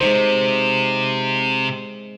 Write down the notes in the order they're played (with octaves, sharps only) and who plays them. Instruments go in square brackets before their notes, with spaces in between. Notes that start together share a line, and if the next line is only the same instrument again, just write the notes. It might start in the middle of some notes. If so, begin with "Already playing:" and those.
[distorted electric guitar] C3 [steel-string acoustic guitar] G#3 D#4 C5